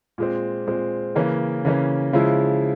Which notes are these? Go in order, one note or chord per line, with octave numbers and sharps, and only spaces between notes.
A#2 G#3 C4
A#2 G#3 C4
C#3 E3 A#3 C#4
C#3 E3 A#3 C#4
C#3 F3 G#3 E4